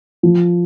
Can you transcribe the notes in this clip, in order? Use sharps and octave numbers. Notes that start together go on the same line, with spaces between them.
F3